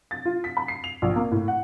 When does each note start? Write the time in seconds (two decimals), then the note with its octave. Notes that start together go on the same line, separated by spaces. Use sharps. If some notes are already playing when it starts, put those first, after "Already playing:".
0.11 A6
0.25 F4
0.44 B6
0.57 B5
0.68 C7
0.84 F7
1.02 A#1
1.16 A#3
1.31 A2
1.48 F#5